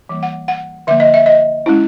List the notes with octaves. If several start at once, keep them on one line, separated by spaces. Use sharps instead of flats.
E3 G3 A#3
F#5
F#5
D3 F3 A#3 E5
D#5
E5
D#5
G#3 C#4 E4